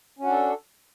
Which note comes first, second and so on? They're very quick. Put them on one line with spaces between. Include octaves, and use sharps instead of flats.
C#4 F#4 D4 A4